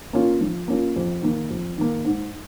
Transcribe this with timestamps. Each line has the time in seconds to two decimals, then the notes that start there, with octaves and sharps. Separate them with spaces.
0.13 A#3 C#4 F4
0.41 F3
0.68 A#3 C#4 F4
0.96 F2
1.23 D#3 A#3
1.50 F2
1.78 D#3 A#3
2.05 G#2